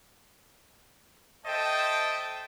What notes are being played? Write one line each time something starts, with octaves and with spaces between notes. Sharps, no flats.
A4 C5 D#5 E5 G5 A5